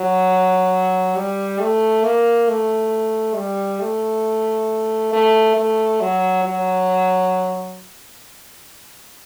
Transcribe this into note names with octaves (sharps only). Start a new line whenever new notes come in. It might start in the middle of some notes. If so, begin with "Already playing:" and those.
Already playing: F#3
G3
A3
A#3
A3
G3
A3
A3
A3
F#3
F#3